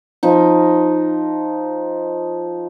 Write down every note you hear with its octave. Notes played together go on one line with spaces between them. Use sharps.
F3 D#4